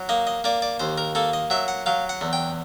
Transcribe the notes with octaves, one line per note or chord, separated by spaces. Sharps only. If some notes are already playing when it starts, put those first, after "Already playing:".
Already playing: F#3
A#3 D#5
D#5
A#3 D5
D5
D#2 C5
A#4
A#3 A4
D#5
F#3 E5
F#5
F#3 F5
F#5
E2
G5